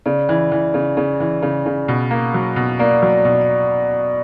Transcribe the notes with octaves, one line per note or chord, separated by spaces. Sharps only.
C#3 D5
E3
E3
C#3
C#3
E3
C#3
C#3
B2
A#3
F#3
B2
A#3 D5
F#3
D5
B2
D5